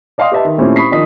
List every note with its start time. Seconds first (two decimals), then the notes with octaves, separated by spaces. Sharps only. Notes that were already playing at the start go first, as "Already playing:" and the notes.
0.18 D5 D#5 F5 G5 C6 D#6
0.32 G4 B4 D#5 E5 A5
0.45 D#3
0.58 A#2 A3 C4 C#4 E4 G4
0.76 B5 C#6 D#6 B6 C7
0.91 D#3 F3 D4 D#5 D#6 B6